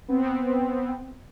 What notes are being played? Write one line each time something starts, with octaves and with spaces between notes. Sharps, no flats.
B3 C4